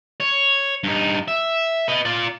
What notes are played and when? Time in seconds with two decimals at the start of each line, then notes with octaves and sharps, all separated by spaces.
0.20 C#5
0.84 G2 D#4
1.28 E5
1.88 B4 D#5
2.05 F4 D5